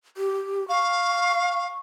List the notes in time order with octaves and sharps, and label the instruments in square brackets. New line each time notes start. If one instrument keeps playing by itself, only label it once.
[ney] G4
[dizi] F5 [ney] C#6